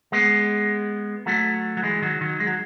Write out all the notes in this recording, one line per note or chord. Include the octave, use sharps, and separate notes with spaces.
G#3 B3
F#3 A3
F#3
E3 G#3
D#3 F#3
D#3 F#3
G#3
F#3